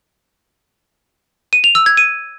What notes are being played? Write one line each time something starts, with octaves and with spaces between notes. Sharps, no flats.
D#7
F7
E6
G#6
D#7